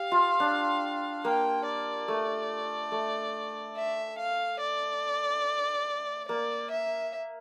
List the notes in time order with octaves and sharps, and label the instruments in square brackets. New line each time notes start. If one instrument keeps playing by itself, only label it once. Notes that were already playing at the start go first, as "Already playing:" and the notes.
Already playing: [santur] G4 [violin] F5
[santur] F4
D4
[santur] A#3 [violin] G5
[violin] D5
[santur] A3
A3
[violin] E5
F5
D5
[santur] A#3 [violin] D5
[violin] E5